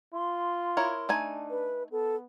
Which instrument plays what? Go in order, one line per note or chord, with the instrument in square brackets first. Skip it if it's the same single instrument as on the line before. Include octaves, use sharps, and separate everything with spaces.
[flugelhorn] F4 [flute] C6
[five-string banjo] E4 A#4 C#5
[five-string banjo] A3 D#4 G#5 [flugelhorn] D4
[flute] B4
[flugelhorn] B3 [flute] A4